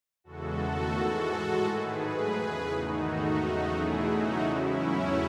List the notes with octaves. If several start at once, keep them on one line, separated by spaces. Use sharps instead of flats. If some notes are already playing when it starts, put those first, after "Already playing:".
E2 C#3 E3 G#3 F#4 A4
E2 D#3 A3
G#2 E3 G#3 F#4 A4
A2 G#3 F#4 A4
G#2 D#3 A3 G#4 B4
G#2 F#3 A3
E2 C#3 E3
E2 D#3 A3 D#4 F#4
G#2 D#3 A3
E2 C#3 F#3 A3
E2 B2 A3 E4 G#4
E2 C#3 F#3 A3 D#4 F#4
G#2 E3 G#3 C#4 E4
E2 C#3 F#3 A3